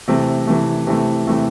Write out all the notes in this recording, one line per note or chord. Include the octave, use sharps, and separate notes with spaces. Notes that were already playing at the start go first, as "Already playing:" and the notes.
C3 E3 A3
C3 E3 A3
C3 E3 A3
C3 E3 A3